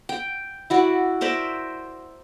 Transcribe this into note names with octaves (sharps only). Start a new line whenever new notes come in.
G5
E4 F#4 D5
A#4 C5 D5 E5